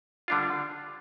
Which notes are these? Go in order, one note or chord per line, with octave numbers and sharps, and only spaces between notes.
D3 G3 D4 F4